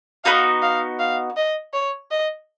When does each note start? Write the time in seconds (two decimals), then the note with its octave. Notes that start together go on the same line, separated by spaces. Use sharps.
0.24 B3 D#4 F#4 F5
0.62 F5
0.99 F5
1.37 D#5
1.73 C#5
2.11 D#5